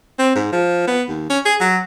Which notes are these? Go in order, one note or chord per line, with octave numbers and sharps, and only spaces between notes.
C4
G#2
F3
B3
D#2
C#4
G#4
F#3